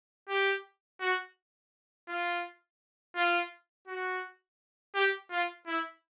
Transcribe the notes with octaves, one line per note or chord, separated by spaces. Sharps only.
G4
F#4
F4
F4
F#4
G4
F4
E4